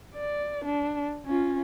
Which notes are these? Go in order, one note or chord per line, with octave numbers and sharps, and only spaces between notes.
D5
D4
C#4 F4